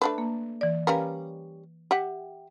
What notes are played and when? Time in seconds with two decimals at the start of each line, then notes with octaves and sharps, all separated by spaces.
0.02 A3 D4 B4
0.18 A#3
0.61 E3 D5
0.87 G3 C#4 A#4 B4 F5
1.91 G4 E5 F#5